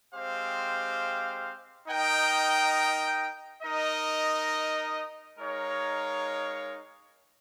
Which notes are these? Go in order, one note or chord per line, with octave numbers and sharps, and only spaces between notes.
G#3 C4 G4 C5 F5
D#4 A#4 D#5 G5
D#4 A#4 D#5
G#3 D#4 A#4 C#5 F5